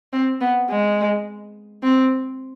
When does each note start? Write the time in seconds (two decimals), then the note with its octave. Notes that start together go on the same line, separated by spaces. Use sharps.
0.13 C4
0.41 B3
0.70 G#3
1.83 C4